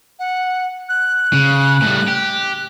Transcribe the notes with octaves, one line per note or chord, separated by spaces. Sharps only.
F#5
F#6
C#3
A2 G3
G4